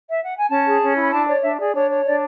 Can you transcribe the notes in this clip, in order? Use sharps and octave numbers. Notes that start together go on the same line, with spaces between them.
E5
F#5
G#5
C#4 A5
G#4
C#4
E4 B5
D4 A5
C#5 D5
D4 E5
G#4 D5
D4 C#5
C#5
D4 D5